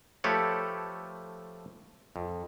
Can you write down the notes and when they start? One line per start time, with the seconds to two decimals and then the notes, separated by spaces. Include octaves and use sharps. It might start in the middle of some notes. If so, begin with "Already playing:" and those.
0.24 F3 A3 G4 A4 B4 C#5
2.16 F2